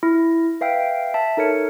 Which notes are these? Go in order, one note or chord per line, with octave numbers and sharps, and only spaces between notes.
E4
B4 E5 F5 G5
E5 A5
D#4 A4 A#4 C#5 C#7